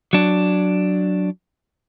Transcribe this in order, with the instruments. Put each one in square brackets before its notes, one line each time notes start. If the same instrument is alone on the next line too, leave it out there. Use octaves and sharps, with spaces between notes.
[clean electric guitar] F#3 D4